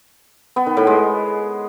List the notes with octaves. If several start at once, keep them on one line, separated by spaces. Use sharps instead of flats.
B3
D#3
A2
G#3